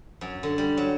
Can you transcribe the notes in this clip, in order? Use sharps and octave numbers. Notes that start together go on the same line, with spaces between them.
F#2
D3
G3
F#3